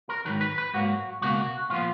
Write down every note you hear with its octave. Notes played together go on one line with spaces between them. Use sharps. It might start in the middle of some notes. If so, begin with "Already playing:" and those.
A#4
G#2 D#3 F#3 B4
B4
B4
G#2 F#3 A#3 F#4
C#2 B2 A#3 F#4
A#2 F3 B3 F4